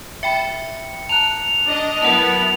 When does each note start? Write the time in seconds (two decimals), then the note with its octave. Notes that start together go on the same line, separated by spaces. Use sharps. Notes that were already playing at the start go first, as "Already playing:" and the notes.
0.23 E5 G5 B5 C#7
1.09 A5 A#5 F#6 F7
1.66 D4 D#5
2.02 F#3 B3 E4 A#4 F#5 A5 F7